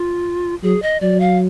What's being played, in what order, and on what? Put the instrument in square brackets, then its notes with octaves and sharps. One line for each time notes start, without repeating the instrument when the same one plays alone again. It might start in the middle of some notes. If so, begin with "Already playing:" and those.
Already playing: [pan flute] F4
[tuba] F#3 [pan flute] G#4
[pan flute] D#5
[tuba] F#3 [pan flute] D5
[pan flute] F5